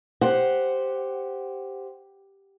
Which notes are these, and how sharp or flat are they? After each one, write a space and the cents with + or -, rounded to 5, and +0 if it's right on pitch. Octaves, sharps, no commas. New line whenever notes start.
G4 +0 C5 +0 F#5 +0